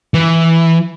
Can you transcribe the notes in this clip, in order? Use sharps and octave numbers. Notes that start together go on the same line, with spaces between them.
E3